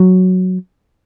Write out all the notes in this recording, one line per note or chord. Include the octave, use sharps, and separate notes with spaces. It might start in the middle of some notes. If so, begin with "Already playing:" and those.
Already playing: F#3